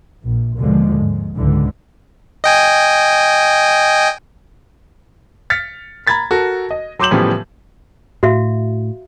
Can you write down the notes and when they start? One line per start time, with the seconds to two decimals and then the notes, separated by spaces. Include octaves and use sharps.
0.22 A#1
0.57 D#2 B2 D3 F3 G#3
0.98 G#2
1.36 C#2 G#2 D3 E3
2.44 D#5 G5 G#5
5.50 F6 A6 B6 C#7
6.07 A#5 B5 G#6 A6 B6
6.31 F#4 A4 A#4
6.71 D#5
6.99 F#3 C6 D6 G6 E7 F#7
7.11 A2 C#3 E3 F3 G3 B3
8.23 A2 F#4 E5 F5